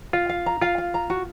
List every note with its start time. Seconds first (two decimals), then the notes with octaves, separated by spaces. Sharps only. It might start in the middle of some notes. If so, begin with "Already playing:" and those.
0.13 F4 F5
0.29 F5
0.46 A#5
0.61 F4 F5
0.78 F5
0.94 A#5
1.10 F#4